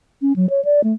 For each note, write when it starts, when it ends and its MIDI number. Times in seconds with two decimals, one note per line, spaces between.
0.22 0.33 61
0.36 0.49 54
0.50 0.64 73
0.65 0.81 74
0.84 0.93 57